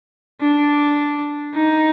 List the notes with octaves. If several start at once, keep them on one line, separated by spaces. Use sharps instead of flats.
D4
D#4